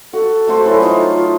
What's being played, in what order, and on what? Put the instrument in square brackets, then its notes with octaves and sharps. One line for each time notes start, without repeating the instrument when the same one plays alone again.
[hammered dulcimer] F#4 [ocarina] A4
[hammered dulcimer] A3 F#4 C5
E3 F#3
[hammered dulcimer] D#4 C5 [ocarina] F4